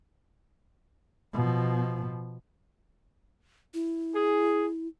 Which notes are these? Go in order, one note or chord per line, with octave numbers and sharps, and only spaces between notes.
B2 F3
E4
G#4